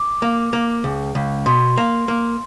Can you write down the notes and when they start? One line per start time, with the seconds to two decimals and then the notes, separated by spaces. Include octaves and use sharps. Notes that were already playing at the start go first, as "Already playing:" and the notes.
Already playing: D6
0.22 A#3
0.53 A#3
0.84 C#2
1.15 C#2
1.46 B2 C6
1.78 A#3
2.08 A#3